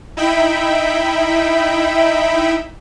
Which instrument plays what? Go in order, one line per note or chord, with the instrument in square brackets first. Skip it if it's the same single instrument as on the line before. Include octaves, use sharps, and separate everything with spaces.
[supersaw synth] D#4 E4 E5 G5 B5